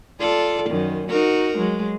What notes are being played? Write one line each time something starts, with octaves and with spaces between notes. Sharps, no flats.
F4 A4 D5
F#2 D#3
D#4 F#4 A#4
F#3 G#3